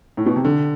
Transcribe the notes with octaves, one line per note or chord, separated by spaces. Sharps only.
A2
B2
C3
D3